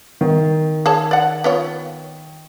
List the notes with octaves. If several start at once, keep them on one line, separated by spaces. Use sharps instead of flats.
D#3
G#4 C#5 A5
D5 F#5
B3 F4 C#5